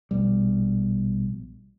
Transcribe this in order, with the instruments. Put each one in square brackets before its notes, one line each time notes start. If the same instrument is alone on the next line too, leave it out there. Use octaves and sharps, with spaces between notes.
[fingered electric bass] A#1 B2 G3